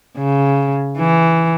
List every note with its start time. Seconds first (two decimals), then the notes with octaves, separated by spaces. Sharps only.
0.17 C#3
0.97 E3